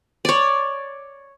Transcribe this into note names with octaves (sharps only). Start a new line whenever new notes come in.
C#5 D5